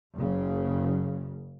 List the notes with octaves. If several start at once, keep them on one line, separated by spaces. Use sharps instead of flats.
F#1 C#3